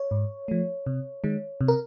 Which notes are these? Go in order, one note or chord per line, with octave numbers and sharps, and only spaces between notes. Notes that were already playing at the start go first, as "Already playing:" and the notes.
Already playing: C#5
G#2
F3 A3
C3
D#3 G#3
C3
A#4